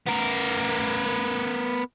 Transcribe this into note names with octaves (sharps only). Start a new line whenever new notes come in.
B3 A#4